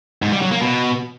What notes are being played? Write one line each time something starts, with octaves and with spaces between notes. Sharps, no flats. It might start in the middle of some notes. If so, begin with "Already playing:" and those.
G#2
G3
F#3
A#3
B2